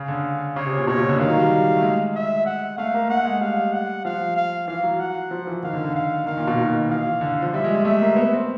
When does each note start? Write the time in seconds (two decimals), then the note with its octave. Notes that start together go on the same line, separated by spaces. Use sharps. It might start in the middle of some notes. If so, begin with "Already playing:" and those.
Already playing: C#3 F5
0.08 D3
0.55 C#3 C#5
0.66 C3
0.77 A#2
0.87 B2 C#5
0.98 C#3
1.09 D3
1.19 D#3 F5
1.30 F#3
1.40 G3
1.76 A3
1.83 G#3
2.15 E5
2.46 F#5
2.78 A3 F5
2.94 A#3
3.09 A3 F#5
3.25 G#3
3.41 G3 F5
3.72 F#5
4.05 F3 F5
4.36 F5
4.68 E3 F5
4.83 F#3
4.99 F#5
5.31 F3
5.47 E3
5.63 D#3 F5
5.73 D3
5.84 D3
5.95 F5
6.26 D#3 F5
6.37 A#2
6.47 B2
6.58 D#3
6.89 E3 F5
7.21 D3
7.42 F3
7.53 G3 E5
7.64 G#3
7.75 G#3
7.85 A3 E5
8.01 A#3
8.16 B3
8.33 C4